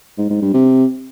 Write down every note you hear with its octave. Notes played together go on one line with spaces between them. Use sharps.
G#2
G#2
G2
C3